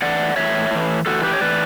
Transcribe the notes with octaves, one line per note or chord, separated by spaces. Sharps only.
A2 E3 D5 F#5
A2 E3 C#5 E5
A2 E3
A2 E3 F#4 A4
G4 B4
C#5
A2 E3 B4 D5